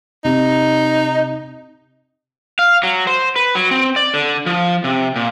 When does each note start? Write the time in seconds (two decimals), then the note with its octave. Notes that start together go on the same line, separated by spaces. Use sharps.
0.25 C3 D#4
2.59 F5
2.83 F#3
3.07 C5
3.36 B4
3.55 F#3
3.71 C4
3.96 D5
4.14 D3
4.46 F3
4.84 C3
5.16 A#2